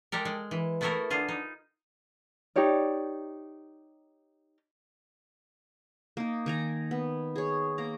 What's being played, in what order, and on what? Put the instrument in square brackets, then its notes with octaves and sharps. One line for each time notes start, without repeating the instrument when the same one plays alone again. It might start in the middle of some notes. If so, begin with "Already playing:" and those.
[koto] G#3 G4 A4 A#4
G#3
E3
A3 B3 E4 F#4 A4 A#4
D3 F4 G#4
D#4
[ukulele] D#4 G4 C#5 D5
[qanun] A#3 D#4
D#3 G#5 A#5
B3
G#4 C#5
A#3 A#5